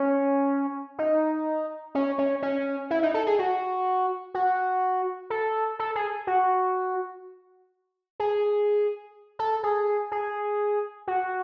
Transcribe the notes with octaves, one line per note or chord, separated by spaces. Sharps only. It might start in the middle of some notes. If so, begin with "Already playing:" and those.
Already playing: C#4
D#4
C#4
C#4
C#4
E4
D#4
A4
G#4
F#4
F#4
A4
A4
G#4
F#4
G#4
A4
G#4
G#4
F#4